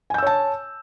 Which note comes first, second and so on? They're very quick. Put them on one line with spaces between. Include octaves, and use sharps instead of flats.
G#5 G6 E6 C#5 A5